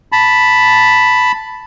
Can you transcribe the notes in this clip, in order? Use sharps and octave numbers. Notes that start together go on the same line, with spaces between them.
A5 B5